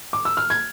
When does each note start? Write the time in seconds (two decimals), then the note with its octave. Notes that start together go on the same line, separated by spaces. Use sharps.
0.13 D6
0.25 E6
0.37 F6
0.50 G#6